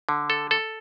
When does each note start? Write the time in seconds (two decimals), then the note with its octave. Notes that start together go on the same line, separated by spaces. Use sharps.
0.09 D3
0.30 A4
0.51 A4